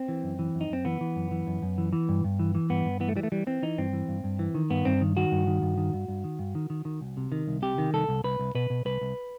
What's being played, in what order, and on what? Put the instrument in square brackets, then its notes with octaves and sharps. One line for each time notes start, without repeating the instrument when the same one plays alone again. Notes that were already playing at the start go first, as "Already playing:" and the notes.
Already playing: [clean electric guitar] C4
E3
F#2
E3
F#2
D#4
F#2 C4
E3 B3
E3
F#2
E3
F#2
F#2
E3
E3
G2
G2
E3
E3
G2 B3
G2
E3 B3
A3
E3 G3
A3
E3 G3
E3 C4
E3 D#4
G2 C4
E3
G2
G2
E3
D#3
G2 B3
G2 C4
D#3
D#3 F#4
G2
D#3
G2
D#3
G2
G2
D#3
G2
D#3
D#3
D#3
C2
C3
D#3
C2
C3 G4
D#3
C2 A4
C2
C2 B4
C2
B2 B4
B2
C2 B4
C2